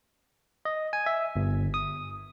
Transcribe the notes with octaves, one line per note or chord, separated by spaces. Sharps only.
D#5
G#5
E5
G1
D#6